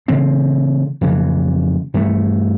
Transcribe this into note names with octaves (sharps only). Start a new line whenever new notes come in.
C#3 E3 A3 C4
F2 C#3 E3
G2 E3 A3